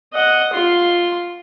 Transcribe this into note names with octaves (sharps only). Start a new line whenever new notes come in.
D#5 F#5
F4 C6